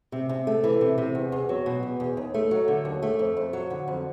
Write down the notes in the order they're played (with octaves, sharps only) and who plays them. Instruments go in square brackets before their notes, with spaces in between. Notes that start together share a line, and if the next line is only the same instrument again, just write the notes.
[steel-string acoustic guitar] C3
C3
A3
E3
C3
C3
E2
E2
F#3
B2
E2
E2
D#2
A3
F#3
D3
D#2
A3
F2
F2
F#3
D3
F2